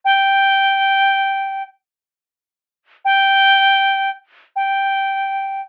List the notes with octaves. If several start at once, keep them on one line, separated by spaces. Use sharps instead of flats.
G5
G5
G5